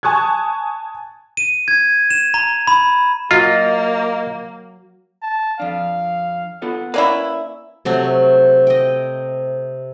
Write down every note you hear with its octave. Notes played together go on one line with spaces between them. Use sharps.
G#5 A5 C#6 D#6 F#6 G#6
D#7
G#6
E7
A#5
B5
F#3 A#3 F4 D#5
A5
F2 D4 F5
B3 F4 A4 F#5
A#3 C#4 E4 B4 D5 C6
C3 F#3 A3 C4
D#5 G5